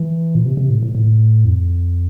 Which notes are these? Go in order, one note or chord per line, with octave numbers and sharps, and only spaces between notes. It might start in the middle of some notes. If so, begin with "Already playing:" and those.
Already playing: E3
A#2
C3
C3
A2
A2
A2
F2